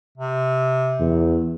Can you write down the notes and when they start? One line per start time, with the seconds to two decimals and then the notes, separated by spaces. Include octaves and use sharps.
0.17 C3
1.00 E2